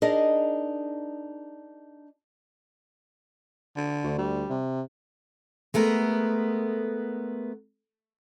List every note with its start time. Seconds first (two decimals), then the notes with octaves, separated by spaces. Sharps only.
0.02 D4 D#4 G#4 A#4 D5 D#5
3.76 D3
4.03 D2
4.19 G3
4.49 C3
5.74 G#3 A3 B3 A#4